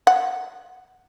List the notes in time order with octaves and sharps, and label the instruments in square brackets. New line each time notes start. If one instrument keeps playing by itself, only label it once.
[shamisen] F#5